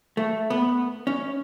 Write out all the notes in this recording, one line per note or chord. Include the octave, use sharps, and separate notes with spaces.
A3
B3
C#4